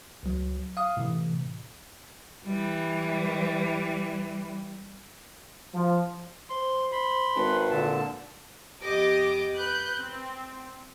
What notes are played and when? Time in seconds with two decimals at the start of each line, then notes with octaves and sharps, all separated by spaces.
0.23 C#2 F#3
0.77 F5 D#6
0.97 A2 C3 E3
2.46 E3 G3
5.74 F3
6.50 C5 C6
6.92 B5 C6
7.36 G#1 B4
7.71 A#2 D3 A5
8.83 F2 B3 G4 D#5 D6
9.56 B4 F#6 G6
9.99 C4